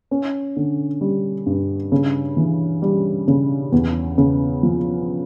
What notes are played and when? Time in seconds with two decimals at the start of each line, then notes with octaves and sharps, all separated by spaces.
0.11 C#4
0.56 D3
1.01 G3
1.46 G2
1.92 C#3
2.37 E3
2.82 G3
3.28 C#3
3.72 E2
4.18 C#3
4.63 F3